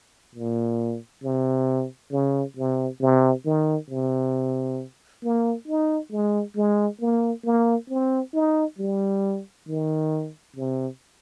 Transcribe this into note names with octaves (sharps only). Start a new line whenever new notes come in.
A#2
C3
C#3
C3
C3
D#3
C3
A#3
D#4
G#3
G#3
A#3
A#3
C4
D#4
G3
D#3
C3